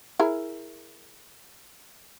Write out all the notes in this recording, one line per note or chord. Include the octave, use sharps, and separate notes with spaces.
E4 G#4 A#4